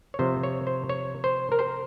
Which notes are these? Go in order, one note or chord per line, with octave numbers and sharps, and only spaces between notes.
C#5
C3 F3 C5
C#5
C5
C#5
C5
A#4
C5